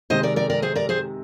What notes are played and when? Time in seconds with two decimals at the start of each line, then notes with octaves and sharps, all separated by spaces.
0.10 C3 D#3 G#3 C5 D#5
0.23 A#4 D5
0.36 A#4 D5
0.50 A#4 D5
0.62 G#4 C5
0.76 A#4 D5
0.89 G#4 C5